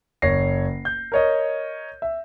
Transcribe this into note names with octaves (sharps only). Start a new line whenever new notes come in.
F#1 C#5 A#6 C7
G6
A#4 C#5 D#5
E5